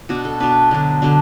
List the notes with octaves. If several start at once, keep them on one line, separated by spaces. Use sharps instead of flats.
B2 B3 D4 F#4
A4
B2 B3 D4 B4
D3 F#3 D4
D3 F#3 D4